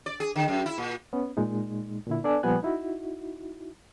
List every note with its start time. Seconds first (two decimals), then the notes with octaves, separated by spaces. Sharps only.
0.06 D5
0.20 G#4
0.36 D3
0.48 F#2
0.66 E4
0.78 A#2
1.13 B3 C#4
1.37 A#2 G#3 D#4
2.07 A#2 D3 E4
2.24 B3 D4 A4 D5 G#5
2.43 A#2 F3 G3 B3 G#5 F#6
2.63 D#4 E4 F#4